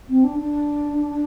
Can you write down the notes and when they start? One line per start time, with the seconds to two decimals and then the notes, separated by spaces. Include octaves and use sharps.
0.09 C4
0.24 D4
0.39 D4